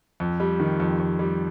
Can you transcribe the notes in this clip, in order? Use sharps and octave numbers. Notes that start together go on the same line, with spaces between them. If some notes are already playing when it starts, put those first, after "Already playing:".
F2
G3
D#3
F2
F2
G3